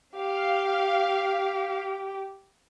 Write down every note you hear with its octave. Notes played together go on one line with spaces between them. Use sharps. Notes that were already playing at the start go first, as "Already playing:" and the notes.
G4 F5